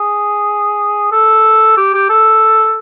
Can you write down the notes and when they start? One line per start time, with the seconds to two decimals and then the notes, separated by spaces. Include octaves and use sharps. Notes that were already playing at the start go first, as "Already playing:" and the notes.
Already playing: G#4
1.12 A4
1.77 G4
1.94 G4
2.09 A4